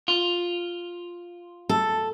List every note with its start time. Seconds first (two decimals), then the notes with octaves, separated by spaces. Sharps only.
0.08 F4
1.69 A4